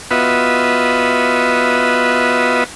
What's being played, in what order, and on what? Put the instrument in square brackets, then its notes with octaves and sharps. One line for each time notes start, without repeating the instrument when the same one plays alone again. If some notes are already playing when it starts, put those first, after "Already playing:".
[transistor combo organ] B3 F4 F#4 B4 D#5 E5